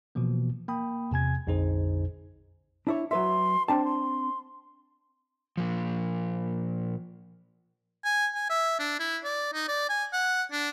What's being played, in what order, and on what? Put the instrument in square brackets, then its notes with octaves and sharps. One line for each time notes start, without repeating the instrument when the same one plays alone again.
[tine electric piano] B2 E3 F3 A#3
A#3 G5 B5 D#6
E2 C3 G#5 G#6
A#1 F2 D3 D#4 G#4 C5
[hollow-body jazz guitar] D4 E4 C#5
[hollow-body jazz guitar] F#3 B4 E5 [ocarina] C6
[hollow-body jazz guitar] C4 D4 A5 [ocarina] G5
[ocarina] C6
[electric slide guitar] A#2 F3
[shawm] G#5
G#5
E5
D4
E4
D5
D#4
D5
G#5
F#5
D4